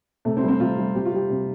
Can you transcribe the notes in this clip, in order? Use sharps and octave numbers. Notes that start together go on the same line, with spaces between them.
C3 A3
C4
G3
C4
C3 F4
G3
C3 G4
F4
G3 G4
C3